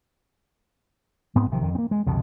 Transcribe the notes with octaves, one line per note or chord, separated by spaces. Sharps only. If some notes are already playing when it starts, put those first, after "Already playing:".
G#2 B3 C4
A#1 C3 D#3 F3
F2 D#3
A#3 C4
G#3
C2 F2 B2 D3